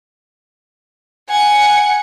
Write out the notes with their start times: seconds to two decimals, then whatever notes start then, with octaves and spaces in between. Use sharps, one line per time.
1.29 F#5 G#5 C#7